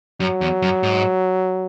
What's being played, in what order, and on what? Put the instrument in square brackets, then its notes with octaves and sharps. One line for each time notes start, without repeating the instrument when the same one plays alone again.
[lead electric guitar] F#2 [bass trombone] F#3
[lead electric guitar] E2
F#2
G#2